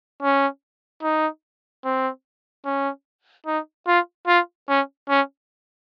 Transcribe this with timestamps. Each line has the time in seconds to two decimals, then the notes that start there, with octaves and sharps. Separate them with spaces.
0.22 C#4
1.02 D#4
1.85 C4
2.65 C#4
3.46 D#4
3.87 F4
4.27 F4
4.68 C#4
5.09 C#4